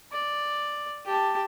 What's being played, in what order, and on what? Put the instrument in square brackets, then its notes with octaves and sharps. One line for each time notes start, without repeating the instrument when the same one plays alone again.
[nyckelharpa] D5
G4 A5